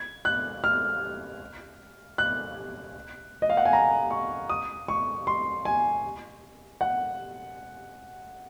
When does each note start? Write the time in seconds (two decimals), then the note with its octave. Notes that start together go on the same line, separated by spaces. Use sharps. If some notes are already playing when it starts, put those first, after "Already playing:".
Already playing: G#6
0.25 F#6
0.64 F6
2.18 F#6
3.42 D#5
3.50 F5
3.57 F#5
3.65 G#5
3.73 A#5
4.10 C#6
4.50 D#6
4.88 C#6
5.27 C6
5.65 G#5
6.81 F#5